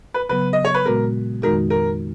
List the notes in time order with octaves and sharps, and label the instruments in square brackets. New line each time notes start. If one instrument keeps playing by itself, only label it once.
[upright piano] B4
[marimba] C#3 F#3 B3 [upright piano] B4
[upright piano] D#5
C#5
B4
[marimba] A#2 G#3 B3 F#4 [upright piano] A#4
[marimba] F2 D#3 G#3 D#4 F#4 [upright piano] A#4
[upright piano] A#4